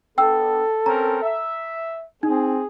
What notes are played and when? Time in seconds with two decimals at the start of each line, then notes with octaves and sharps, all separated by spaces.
0.18 B3 D4 A4 G5 E6
0.86 C4 C#4 A#4 A#5
1.22 E5
2.23 C4 D#4 G#4